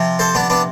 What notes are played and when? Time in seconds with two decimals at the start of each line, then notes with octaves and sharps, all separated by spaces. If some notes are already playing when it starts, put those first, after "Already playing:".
Already playing: C3 F3
0.19 A4 C5
0.35 B3 D4
0.50 B3 D4